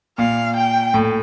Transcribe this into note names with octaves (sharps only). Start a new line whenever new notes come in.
A#2 F5
G5
A2